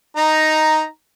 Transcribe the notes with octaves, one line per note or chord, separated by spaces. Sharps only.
D#4 A#5